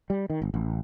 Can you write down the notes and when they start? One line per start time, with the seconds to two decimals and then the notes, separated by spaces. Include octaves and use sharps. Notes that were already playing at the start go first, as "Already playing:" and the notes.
0.10 G3
0.30 D#3
0.42 G1
0.54 A1